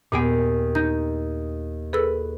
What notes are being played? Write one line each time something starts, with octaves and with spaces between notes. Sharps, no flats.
D#2 A#2 B3 G#4 G5
D#4 G6
G#4 A4 B4 E6